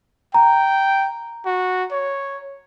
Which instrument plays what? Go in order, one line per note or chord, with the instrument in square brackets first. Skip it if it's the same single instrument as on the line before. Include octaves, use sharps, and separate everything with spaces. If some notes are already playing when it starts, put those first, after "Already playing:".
[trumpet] G5 [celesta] A#5
[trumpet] F#4
C#5